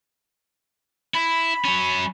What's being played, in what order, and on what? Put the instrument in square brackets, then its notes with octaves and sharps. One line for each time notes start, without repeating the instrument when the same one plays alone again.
[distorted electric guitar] E4 [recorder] B5
[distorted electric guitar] F#3 C#4